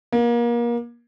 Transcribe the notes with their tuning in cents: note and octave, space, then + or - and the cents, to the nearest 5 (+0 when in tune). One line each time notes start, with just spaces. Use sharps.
A#3 +30